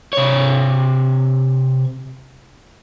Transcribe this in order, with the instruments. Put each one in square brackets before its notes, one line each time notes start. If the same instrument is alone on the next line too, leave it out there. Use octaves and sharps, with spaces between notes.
[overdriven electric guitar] C3 C#5